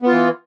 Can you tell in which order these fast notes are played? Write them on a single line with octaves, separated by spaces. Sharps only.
B3 F4 E3